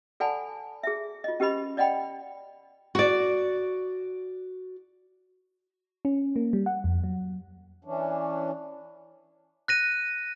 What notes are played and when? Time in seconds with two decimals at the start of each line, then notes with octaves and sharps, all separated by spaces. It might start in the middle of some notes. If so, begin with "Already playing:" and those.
0.20 A4 D5 F#5 G#5 A5 B5
0.83 G#4 E5
1.24 F4 D#5
1.40 C#4 G4 B4 D#5 B5
1.77 D5 D#5 F#5 G5 B5
2.95 F#4 D5
6.05 C#4
6.36 A#3
6.53 G3
6.66 F#5
6.84 F2
7.04 F#3
7.85 E3 C#4 D4
9.68 F#6 A#6 D#7